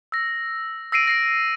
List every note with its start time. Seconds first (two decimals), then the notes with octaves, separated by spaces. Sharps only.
0.12 E6 A#6
0.92 E6 A#6 C7 D7 D#7
1.07 A#6 C7 D7